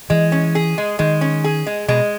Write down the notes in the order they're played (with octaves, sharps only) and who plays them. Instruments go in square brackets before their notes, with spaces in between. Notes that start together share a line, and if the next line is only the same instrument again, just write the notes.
[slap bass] E3 [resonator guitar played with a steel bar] G#3
[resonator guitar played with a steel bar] C#4
G#4
G#3
[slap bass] D#3 [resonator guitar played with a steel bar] G#3
[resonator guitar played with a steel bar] C#4
G#4
G#3
[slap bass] B2 [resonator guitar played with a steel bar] G#3